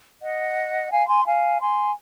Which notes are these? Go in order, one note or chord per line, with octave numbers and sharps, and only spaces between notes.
D#5 F#5
F5 G#5
G#5 C6
F5 G#5
G#5 C6